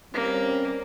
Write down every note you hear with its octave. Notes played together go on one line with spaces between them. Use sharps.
G3 A#3 C4 C#4